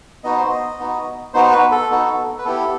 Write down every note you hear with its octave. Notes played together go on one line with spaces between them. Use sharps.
B3 D#4 F#4 D#5
C5
D#5
B3 D#4 F#4
B3 D#4 F#4 C5
B4
A4
B3 D#4 F#4
B4
B3 E4 G4 A4